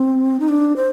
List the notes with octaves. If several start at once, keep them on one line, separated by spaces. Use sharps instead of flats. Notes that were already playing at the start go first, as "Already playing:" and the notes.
Already playing: C4
D#4
D4
C5